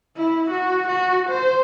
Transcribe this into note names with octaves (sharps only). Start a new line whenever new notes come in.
E4
F#4
F#4
C5